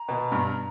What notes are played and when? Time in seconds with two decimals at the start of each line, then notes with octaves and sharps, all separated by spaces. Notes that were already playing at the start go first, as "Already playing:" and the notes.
Already playing: A#5
0.08 B2
0.32 G2